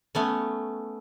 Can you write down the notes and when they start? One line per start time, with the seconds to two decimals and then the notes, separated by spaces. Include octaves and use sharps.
0.15 A3 B3 C#4